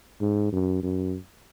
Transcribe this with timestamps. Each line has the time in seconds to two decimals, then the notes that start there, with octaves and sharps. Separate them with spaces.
0.21 G#2
0.52 F#2
0.83 F#2